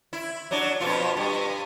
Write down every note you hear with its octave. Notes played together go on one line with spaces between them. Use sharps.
E4
F#3 D4
F2 B2 F4
G2